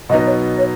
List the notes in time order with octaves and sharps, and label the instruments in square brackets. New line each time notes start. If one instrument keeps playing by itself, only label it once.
[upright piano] B2 F#3 B3 D#4 [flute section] D#5
[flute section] C#5
C#5